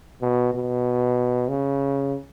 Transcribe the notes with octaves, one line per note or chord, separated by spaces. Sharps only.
B2
B2
C#3